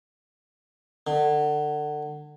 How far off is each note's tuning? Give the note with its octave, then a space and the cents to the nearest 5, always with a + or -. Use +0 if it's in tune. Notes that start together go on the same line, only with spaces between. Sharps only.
D3 +30